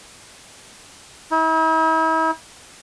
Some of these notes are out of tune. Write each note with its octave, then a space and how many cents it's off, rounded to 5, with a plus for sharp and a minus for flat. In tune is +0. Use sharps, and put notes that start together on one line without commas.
E4 -45